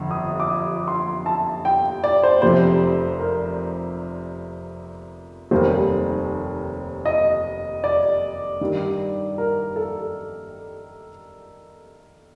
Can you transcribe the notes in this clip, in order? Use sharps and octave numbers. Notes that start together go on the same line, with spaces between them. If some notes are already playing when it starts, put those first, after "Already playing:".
Already playing: G1 F2 D3
D#6
D6
D#6
C6
A5
G5
D5
C5
F1 F2 C3 C5
A#4
F1 D#2 D#3 G3 A#3 C5
D#5
D5
G2 D#3 G3
A#4
A4